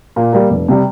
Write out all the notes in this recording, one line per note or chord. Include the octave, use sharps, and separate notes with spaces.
A#2
G3 A#3
F1
C3 G3